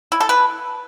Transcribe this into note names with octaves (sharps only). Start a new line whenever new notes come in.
E4
A4
B4